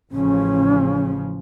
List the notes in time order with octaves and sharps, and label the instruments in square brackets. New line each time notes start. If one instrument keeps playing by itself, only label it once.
[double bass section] A1 C#3 F3 [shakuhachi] C#4